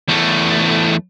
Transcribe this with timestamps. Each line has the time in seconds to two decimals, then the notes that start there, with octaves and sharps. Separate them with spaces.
0.08 E2 A3